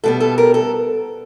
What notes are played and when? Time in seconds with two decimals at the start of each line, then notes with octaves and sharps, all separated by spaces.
0.04 B2 G3 B3 A4
0.20 A4
0.38 A#4
0.54 A4